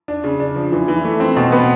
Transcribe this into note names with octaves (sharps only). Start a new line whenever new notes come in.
D4
C#3
D4
F3
E3
E3
A3
C4
B2
B3